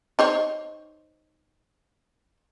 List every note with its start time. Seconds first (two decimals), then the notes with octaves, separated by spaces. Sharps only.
0.19 D#4 C5 C#5